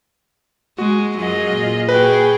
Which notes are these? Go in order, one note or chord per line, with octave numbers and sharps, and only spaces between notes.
G#3 F#4
F#2 F#3 F4 G#4 D#5
A#2
F#4 G#4 B4 G5